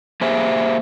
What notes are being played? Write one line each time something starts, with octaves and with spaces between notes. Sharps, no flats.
A#3 G4 G#4 C5 E5